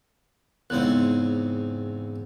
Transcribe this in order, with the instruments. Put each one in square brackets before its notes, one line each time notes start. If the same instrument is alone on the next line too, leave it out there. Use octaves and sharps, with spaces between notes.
[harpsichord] E2 C#3 C4 [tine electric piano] G#2 F#6